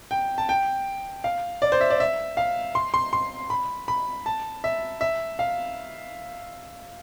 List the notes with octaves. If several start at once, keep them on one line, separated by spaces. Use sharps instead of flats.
G5
A5
G5
F5
D5
C5
E5
D5
E5
F5
C6
C6
C6
B5
B5
A5
E5
E5
F5